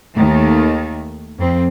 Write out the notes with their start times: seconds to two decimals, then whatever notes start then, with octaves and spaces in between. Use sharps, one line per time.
0.15 D#2 D#3 A3
1.39 F2 C4